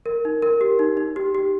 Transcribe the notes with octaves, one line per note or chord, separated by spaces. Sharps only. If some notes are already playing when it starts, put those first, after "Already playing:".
A#4
D#4
A#4
G4
D#4
D#4
G4
G4